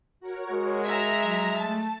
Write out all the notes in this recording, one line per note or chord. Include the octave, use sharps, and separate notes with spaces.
F#4 A#4 C#5
G#3
E5 A#5
F#3
A3 A5